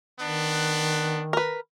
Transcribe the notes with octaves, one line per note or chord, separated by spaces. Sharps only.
D#3 B3 D4
A#4 B4